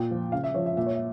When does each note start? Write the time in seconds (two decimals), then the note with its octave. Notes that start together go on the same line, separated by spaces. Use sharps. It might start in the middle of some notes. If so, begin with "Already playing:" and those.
Already playing: A#2 G5
0.11 F3
0.32 C#3 F5
0.44 E5
0.54 F3 C#5
0.66 E5
0.77 A#2 E5
0.86 C#5
0.95 E5